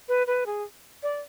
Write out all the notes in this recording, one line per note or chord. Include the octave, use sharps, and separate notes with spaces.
B4
B4
G#4
D5